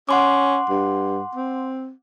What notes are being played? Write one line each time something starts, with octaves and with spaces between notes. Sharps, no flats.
C#4 F#5 C6 D6
G2
C4